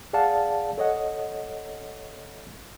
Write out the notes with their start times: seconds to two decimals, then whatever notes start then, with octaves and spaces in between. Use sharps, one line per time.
0.13 G#4 D5 F5 F#5 A5
0.78 A4 C#5 D#5 F#5